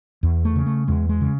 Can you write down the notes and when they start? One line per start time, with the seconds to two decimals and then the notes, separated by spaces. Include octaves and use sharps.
0.23 E2
0.45 A3
0.56 C#3
0.66 A3
0.88 E2 G#3
1.09 G#3
1.21 C#3